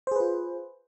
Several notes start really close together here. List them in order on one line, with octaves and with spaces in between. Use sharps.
C5 G#4 B4 F4